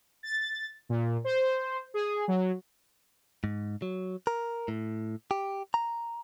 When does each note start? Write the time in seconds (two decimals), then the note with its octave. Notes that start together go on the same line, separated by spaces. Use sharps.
0.23 A6
0.89 A#2
1.24 C5
1.94 G#4
2.28 F#3
3.44 G#2
3.82 F#3
4.27 A#4
4.68 A2
5.31 G4
5.74 A#5